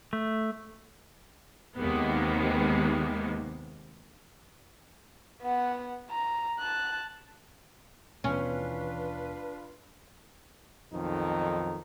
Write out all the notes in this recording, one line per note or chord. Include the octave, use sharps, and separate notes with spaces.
A3
D#2 C3 D#3 G#3 A#3 B3
B3 F#5
A#5
A5 F#6
D#2 B2 E3 C#4 D4 F4 B4
B1 F2 D#3 D#4